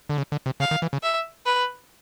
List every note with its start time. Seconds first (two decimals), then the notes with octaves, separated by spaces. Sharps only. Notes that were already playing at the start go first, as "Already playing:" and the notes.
0.09 D3
0.18 C#3
0.32 D3
0.46 C3
0.60 C#3 F5
0.71 D#3
0.82 E3
0.93 C#3
1.03 E5
1.46 B4